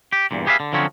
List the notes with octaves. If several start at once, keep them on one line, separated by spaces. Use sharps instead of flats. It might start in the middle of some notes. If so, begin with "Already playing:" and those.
G4
E2 G2 A#2
G4 G#4 B4 C#5 E5 F5
D3
D3 F3 F#3 C4 C#4